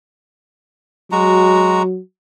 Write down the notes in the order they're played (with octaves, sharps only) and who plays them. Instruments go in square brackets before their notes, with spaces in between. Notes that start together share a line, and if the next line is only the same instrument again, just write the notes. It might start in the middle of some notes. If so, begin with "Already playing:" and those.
[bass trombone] F#3 [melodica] G#3 F#4 A#5